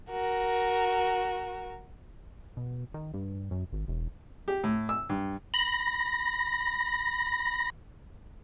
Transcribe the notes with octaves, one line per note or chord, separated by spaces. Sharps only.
F#4 A#4
B2
D#3
G2
F#2
G#1
E1
G4
A2
E6
G2
B5 A#6